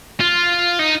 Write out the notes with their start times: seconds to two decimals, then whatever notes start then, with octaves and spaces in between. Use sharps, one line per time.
0.20 F4
0.79 D#4